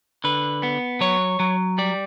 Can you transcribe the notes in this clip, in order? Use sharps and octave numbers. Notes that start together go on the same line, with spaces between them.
D3 B4
B3
F#3 C#5
F#3
G3 D5